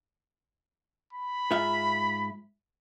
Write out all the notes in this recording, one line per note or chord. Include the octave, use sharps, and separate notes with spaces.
B5
G#2 F4 E5